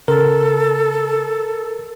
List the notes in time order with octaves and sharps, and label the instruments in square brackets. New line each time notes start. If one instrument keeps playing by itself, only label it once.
[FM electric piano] C#3 [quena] A4 [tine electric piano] A#4